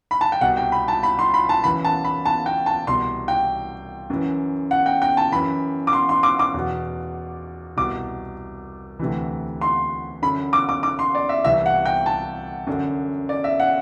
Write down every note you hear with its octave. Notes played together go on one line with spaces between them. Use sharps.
B5
A5
G5
C2 B2 F#5
G5
B5
A5
B5
C6
B5
A5
F#2 E3 B5
A5
B5
A5
G5
A5
C2 B2 C6
G5
F#2 E3
F#5
G5
G5
A5
F#2 E3 B5
D6
C6
C6
D6
D6
E2 B2
C2 B2 D6
D2 C3 E3
C6
F#2 D3 B5
D6
D6
D6
C6
D5
E5
C2 C3 E3 E5
F#5
G5
A5
F#2 D3
D5
E5
F#5